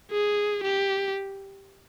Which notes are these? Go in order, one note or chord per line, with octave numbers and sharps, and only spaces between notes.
G#4
G4